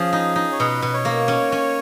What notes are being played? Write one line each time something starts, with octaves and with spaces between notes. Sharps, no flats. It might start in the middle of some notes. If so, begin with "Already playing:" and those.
Already playing: F3 C#4 G#4
D#4
D#4
C#5
B2 B4
B2
C#5
A#3
C#4
C#4